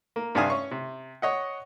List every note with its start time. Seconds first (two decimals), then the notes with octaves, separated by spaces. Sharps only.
0.16 A#3
0.35 G2 C3 D4 F5 G#5 D#6
0.50 C#4 C#6
0.71 C3
1.22 C#5 D#5 F#5